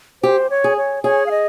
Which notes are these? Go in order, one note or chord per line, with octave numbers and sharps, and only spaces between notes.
G4 C5
C#5
G#4
C#5
G#4 C#5
F5
D#5